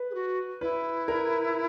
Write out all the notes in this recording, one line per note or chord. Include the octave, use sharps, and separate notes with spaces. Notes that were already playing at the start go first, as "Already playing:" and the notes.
Already playing: B4
G#4
F#4
E4 B4
A#4